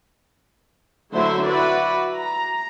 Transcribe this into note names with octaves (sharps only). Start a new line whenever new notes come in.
D3 F#3 A3 E4 C5 E5
E4 F#4 B4 D5
A#5